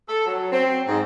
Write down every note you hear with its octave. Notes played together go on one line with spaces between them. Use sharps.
A4
F#3
C4
G#2